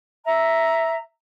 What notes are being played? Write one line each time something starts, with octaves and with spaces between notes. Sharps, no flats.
E5 A#5